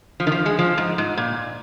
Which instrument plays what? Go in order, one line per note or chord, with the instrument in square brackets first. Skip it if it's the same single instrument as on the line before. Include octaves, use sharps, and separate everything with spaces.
[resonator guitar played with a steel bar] F3
D#3
F3
G#3
F3
G#2
G#2
A#2